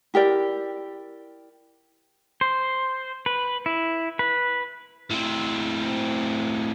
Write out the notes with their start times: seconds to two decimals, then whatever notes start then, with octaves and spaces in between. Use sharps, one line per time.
0.14 E4 G4 A#4 D5
2.41 C5
3.26 B4
3.66 E4
4.19 B4
5.11 A2 C4